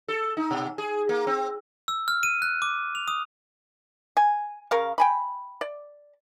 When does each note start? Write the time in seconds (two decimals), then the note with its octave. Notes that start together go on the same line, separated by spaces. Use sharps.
0.08 A4
0.37 D#4
0.51 B2
0.78 G#4
1.09 A#3
1.27 C4
1.88 E6
2.08 F6
2.23 D#7
2.42 F#6
2.62 D6
2.95 F7
3.08 D#6
4.17 G#5
4.71 C#3 A#4 F5
4.98 G5 G#5 B5
5.61 D5